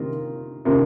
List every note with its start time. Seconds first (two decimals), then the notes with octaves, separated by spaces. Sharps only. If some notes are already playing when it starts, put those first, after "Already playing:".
Already playing: C3 D#3 A#3 F4 A#4
0.65 C3 D#3 A#3 F4 A#4